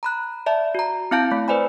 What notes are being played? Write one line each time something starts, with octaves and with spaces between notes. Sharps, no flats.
A#5 B5 F#6
D5 E5 A5
F#4 A#5
C4 E4 F5 A5 G6 D7
A3
B4 C5 D5 G#5 B5